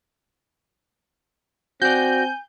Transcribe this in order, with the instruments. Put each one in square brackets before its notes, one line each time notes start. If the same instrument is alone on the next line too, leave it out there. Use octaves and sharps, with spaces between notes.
[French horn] C4 [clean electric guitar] F#4 D5 [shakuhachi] G#5 [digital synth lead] G6